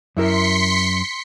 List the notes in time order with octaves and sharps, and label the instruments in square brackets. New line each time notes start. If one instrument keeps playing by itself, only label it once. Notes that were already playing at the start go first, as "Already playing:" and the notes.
[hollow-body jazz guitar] F#2 E4 A#4 [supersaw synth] C6 B6 C#7